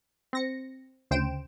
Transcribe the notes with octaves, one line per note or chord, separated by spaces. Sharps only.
C4 A#6 C#7
D2 C#3 C5 G5 D7 E7